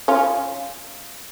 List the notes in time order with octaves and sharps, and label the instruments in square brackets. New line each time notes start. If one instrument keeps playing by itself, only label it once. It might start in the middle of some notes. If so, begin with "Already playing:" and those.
[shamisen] C#4 F4